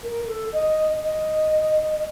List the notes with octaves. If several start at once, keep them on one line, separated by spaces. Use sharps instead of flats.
A#4
A4
D#5
D#5